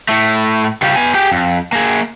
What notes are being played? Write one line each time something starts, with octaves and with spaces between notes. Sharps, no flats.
A2 A3
C#3 G3 C#4 F4 G4
B3 G#5
G4 G#4 G5
F2
A#3 G#4